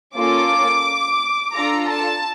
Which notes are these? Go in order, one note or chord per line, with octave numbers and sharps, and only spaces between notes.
A#3 C#4 F4 A4 D6
D4 F4 A4 A#5
A5